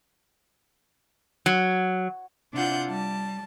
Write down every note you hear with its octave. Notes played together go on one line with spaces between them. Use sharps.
F#3
C3 D4 E4 F4 F#5 G6
G3 A5